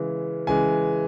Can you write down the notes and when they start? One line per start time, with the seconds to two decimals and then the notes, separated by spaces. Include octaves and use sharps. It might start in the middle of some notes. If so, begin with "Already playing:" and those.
Already playing: C#3 E3 G#3
0.47 C#3 E3 G#3 G#5